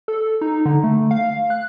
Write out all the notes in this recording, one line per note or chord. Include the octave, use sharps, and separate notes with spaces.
A4
D#4
D3
A3
F5
F#6